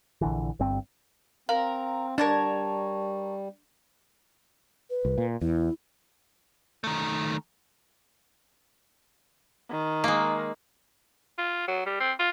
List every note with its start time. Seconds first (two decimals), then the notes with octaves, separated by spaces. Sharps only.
0.21 A#1 D3 E3
0.59 G1 G2 C4
1.49 C4 A#4 F5
2.18 G3 D4 A#4 C#5 A5
4.90 B4
5.05 C2
5.18 A#2
5.41 E2 E4
6.84 D#3 A3
9.71 D#3
10.04 G#3 A#3
11.38 F4
11.68 F#3
11.86 G3
12.00 C4
12.19 F4